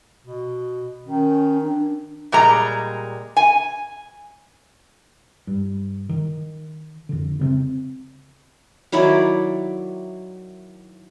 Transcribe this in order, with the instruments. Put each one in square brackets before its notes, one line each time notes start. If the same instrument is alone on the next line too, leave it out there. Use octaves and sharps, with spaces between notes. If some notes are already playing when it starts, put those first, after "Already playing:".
[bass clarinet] B2
[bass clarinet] D#3 [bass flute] C#4
[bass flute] D4
[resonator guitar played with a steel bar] A#2 G3 G#3 A#5
G#5
[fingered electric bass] G2
D#3
F2 D3
C#3 A3 C4
[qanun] D#3 F#3 E4 D5